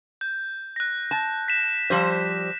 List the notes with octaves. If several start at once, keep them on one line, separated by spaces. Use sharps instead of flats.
G6
F#6 A#6
A5
B6 E7
F3 G3 C5